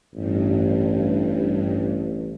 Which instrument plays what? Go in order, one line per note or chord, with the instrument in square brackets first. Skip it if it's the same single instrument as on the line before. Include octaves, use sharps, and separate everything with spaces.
[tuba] A1 [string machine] G2